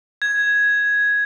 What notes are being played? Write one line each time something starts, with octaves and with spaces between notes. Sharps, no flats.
G#6